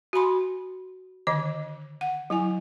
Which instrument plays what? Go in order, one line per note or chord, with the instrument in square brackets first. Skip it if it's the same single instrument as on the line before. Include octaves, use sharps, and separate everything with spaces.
[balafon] F#4 G#5 B5 C6
D3 D#3 D#5
F#5
F#3 E4 G#5